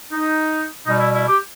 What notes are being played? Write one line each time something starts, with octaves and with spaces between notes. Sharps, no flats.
D#4
B2 G3 D#4
E4
E4
G4